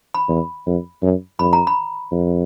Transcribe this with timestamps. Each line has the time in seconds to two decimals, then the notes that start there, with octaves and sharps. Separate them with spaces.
0.14 B5
0.29 E2
0.66 F2
1.02 F#2
1.39 F2 B5
1.53 A#5
1.67 B5
2.12 F2